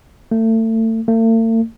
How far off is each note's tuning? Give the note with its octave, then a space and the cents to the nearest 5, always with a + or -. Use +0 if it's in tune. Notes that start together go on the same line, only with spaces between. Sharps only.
A3 +30
A3 +45